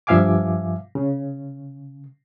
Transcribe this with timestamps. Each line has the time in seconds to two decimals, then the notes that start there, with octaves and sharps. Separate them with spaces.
0.07 G2 F3 E5 F5 G#5 D6
0.95 C#3